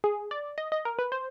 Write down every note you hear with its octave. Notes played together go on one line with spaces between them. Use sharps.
G#4
D5
D#5
D#5
A#4
B4
C5